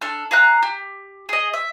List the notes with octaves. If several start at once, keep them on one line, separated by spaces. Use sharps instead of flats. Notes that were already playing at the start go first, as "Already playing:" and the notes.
D4 A4 F6
G#4 F5 A#5 F#6
G4
G#4 D#5
E5